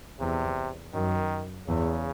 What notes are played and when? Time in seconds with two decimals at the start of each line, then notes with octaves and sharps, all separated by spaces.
0.20 E2 C3
0.93 F#2 D#3
1.67 E2 C#3